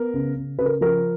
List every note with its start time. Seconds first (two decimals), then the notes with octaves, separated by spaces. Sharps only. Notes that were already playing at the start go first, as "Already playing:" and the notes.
Already playing: B3 A#4
0.14 C#3
0.36 C#3
0.58 C#3 B4
0.66 A#4
0.81 F3 A#4